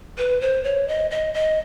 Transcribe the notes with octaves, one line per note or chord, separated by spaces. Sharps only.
B4
C5
C#5
D#5
D#5
D#5